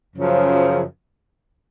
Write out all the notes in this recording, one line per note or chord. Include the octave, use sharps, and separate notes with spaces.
F#2 C#3 F3